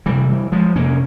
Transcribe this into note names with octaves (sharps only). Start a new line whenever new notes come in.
F2 C3 E3 G3
E3 G3
F3 G#3
F2 C3 A#3 C#4